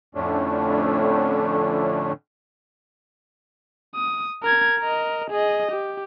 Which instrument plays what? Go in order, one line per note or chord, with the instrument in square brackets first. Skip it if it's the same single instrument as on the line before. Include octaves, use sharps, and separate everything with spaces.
[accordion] F2 A2 D3 A3 C#4 D4
[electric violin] D#6
A#4 G#6
A#4 D#5
G#4 D#5
G4